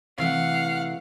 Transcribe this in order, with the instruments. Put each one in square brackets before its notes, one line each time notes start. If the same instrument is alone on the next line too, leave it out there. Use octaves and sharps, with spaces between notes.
[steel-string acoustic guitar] C3 E3 A3 [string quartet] F5 F#5